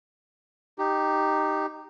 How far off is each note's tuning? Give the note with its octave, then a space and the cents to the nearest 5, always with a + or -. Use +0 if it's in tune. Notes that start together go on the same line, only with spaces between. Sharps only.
D#4 -10 G4 +0